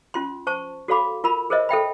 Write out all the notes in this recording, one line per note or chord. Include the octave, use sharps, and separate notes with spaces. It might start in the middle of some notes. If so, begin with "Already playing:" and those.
C#4 F4 C6
C5 A5 C#6
F#4 A4 C#5 F5 B5 D6
F4 A#4 B5
G#4 A#4 C5 C#5 D#5 E5
A4 E5 G5 B5